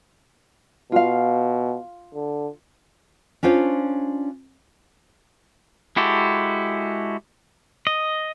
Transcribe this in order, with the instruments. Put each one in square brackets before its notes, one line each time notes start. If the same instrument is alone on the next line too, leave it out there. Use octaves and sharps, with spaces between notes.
[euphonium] B2 [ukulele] F4 F5
[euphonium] D3
[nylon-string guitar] C#4 D4 F4 C5 C#5
[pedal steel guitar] G#3 E4 F#4 G4 A4
D#5